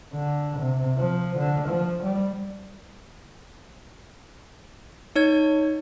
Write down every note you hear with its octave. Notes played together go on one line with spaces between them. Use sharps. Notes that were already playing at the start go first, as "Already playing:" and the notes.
D3
C3
F3
D3
F3
G3
D#4 C#5 G#6